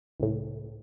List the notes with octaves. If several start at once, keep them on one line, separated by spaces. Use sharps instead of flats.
C#2 A2